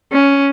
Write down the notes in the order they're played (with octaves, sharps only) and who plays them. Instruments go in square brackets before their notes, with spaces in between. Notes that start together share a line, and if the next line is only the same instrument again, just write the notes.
[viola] C#4